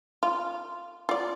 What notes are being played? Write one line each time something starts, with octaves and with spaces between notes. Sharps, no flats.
F4
F4 D5